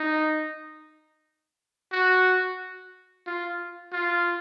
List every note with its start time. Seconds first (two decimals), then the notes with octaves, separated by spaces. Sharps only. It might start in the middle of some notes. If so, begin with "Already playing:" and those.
Already playing: D#4
1.92 F#4
3.27 F4
3.92 F4